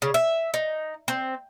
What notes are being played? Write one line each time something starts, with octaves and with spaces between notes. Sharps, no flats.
C#3
E5
D#4
C4